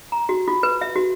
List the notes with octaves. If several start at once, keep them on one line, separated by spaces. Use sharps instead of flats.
A#5
F#4
F4
B4
E5
F#4